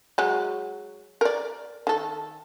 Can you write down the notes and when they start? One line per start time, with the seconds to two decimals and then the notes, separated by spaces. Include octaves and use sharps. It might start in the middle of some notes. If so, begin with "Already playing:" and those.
0.18 F#3 G#3
1.21 A#4 D5
1.87 D#3 A4